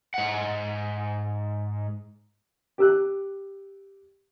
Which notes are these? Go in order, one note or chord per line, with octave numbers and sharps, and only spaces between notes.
G#2 F#5
G4 E6 F#6